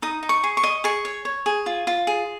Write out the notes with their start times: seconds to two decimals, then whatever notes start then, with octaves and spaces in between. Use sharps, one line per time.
0.02 D#4 D#6
0.23 D#4
0.29 C#6
0.44 G#4
0.57 C#6
0.63 D#5
0.84 G#4 C#6
1.05 C#5
1.25 C#5
1.46 G#4
1.66 F4
1.87 F4
2.07 G#4